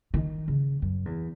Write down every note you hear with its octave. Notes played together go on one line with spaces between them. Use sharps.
D#3
C#3
F#2
E2